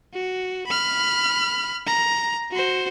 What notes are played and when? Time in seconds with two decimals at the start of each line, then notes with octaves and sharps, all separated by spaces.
0.14 F#4
0.67 B5 F6
1.87 A#5
2.52 F#4 C5